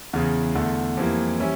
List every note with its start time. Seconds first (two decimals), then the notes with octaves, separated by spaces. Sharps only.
0.13 E2 C#3 E3
0.55 E2 D3 A3
0.97 F2 E3 G3 A#3
1.40 E3 G3 C#4 E4